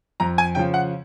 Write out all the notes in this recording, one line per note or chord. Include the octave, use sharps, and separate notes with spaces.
F2 A#5
G#5
C#3 F3 G5
F#5